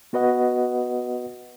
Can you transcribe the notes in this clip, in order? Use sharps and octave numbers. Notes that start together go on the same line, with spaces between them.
B3 F#4 B4 D#5 F#5